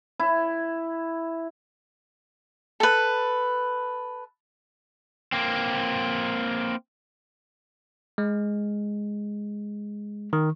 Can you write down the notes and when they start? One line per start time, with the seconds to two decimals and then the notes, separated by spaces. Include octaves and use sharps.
0.19 E4
2.80 A4 B4
5.32 A#3 C4
8.18 G#3
10.33 D#3